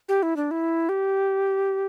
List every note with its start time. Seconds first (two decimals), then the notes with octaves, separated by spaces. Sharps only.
0.09 G4
0.23 E4
0.37 D4
0.51 E4
0.89 G4